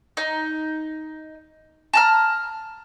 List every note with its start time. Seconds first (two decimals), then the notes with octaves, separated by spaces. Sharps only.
0.17 D#4
1.93 A5 A#5 F6